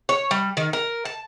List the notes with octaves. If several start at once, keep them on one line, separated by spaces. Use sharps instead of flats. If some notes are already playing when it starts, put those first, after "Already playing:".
C#5
G3
D#3
A#4
A5